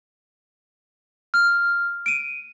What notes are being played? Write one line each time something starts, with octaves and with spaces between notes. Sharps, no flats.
F6
D7 D#7